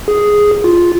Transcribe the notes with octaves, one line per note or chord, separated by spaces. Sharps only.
G#4
F4